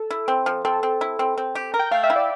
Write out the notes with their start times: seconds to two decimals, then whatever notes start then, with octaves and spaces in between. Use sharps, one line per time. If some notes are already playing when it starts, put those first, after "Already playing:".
Already playing: A4
0.11 E4
0.28 C4
0.46 F3
0.65 C4 A4
0.83 C4
1.01 E4
1.19 C4
1.38 C4
1.55 G4
1.74 A#4
1.79 G5
1.91 A3 F5
2.04 E5
2.10 E4
2.16 D5